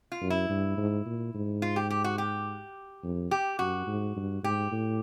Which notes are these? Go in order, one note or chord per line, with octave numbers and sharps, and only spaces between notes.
F4
F#2
E4
G2
G#2
A#2
G#2
F4
G4
G4
F#4
G4
F2
G4
F#2 F#4
G#2
G2
G#2 G4
A2